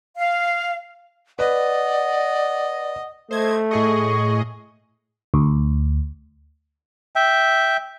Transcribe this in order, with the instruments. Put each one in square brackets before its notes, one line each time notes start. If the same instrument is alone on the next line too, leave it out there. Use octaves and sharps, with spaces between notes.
[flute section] F5
[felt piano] B4 [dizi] D5 [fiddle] D#5 [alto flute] F#5
[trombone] A3 [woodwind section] A4 D#5 [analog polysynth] C5 G#6
[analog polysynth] A2 G#4 D#5 [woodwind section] C#6
[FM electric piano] D2
[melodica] E5 G5